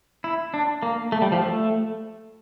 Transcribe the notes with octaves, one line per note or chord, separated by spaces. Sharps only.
E4
D4
A#3
A3
G3
F3
A3